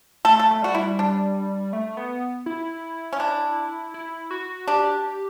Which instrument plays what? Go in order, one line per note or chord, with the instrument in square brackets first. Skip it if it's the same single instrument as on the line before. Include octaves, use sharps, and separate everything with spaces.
[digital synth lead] A3 [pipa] A4
[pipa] A4
[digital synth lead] A3
[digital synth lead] G3 [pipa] F#4
[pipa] E4
[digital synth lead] G3 [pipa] D4
[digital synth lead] A3
B3
E4
[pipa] C#4
D4
[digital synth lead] E4
F#4
[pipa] D4 [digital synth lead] G4